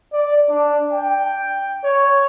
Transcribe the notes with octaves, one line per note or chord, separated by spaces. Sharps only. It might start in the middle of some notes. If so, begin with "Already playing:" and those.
D5
D4
G5
C#5